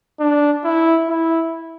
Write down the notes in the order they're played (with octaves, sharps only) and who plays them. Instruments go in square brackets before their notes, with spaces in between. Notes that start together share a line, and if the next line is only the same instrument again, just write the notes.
[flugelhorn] D4
E4
E4